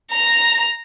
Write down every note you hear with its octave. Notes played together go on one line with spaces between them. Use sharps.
A#5